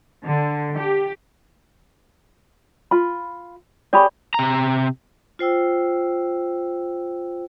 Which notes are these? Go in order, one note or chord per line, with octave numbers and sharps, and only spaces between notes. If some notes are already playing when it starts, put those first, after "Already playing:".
D3
G4
F4 B5
G4 G#4 C#5 D5 B5 C#6
C3 A#5
F4 C5 G5 E6